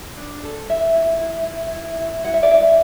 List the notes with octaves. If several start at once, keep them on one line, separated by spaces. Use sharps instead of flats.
D4
A4
E4 E5
E4
E4
E4
E4
E4
E4 F#5
E5
D5
E4 E5